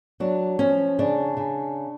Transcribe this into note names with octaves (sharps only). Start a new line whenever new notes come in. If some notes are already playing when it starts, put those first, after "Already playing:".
F#3 D4
F3 C#4
C#3 D4
C#3